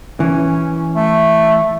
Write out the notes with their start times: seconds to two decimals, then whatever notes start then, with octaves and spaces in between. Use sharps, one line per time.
0.20 E3 C#4
0.96 A3